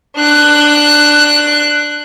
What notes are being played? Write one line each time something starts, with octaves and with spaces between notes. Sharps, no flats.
D4 F#6